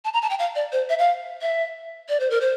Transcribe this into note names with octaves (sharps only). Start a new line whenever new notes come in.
A5
A#5
A5
G5
F5
D5
C5
E5
F5
E5
D5
C5
A#4
C5